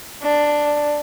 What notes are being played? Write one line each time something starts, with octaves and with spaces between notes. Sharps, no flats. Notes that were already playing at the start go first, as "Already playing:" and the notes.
D4